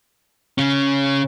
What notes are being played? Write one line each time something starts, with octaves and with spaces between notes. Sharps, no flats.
C#3 C#4